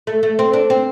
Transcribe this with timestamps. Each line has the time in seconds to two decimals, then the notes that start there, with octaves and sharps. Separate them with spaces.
0.07 A3
0.23 A3
0.39 C4
0.53 D4
0.70 C4